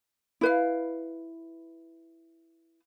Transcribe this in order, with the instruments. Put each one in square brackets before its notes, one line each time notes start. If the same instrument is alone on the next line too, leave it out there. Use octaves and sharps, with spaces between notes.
[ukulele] E4 B4 F5